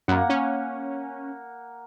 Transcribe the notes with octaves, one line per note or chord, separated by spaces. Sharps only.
F#2 A#3 F#5
C#4